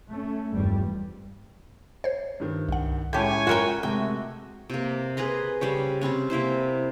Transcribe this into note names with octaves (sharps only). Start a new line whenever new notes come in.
A3 C#4
F1 E2 G2 G3
C5 C#5
G2 D#3
C2 F#5
A2 G#3 C#4 E4 G4 C#5 G#5 G6
F4 F#4 A#4 G5 A#5
C3 G#3 A3 F#4 G5
C3 A#3
G#4 B4 A#5 C6
C#3 G3 C5 C#5
C3 G3 C4 C#4
C3 A#3 E4 C5